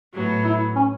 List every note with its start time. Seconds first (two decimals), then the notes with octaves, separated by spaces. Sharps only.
0.14 A2 F#3 B3
0.45 E4
0.76 C#4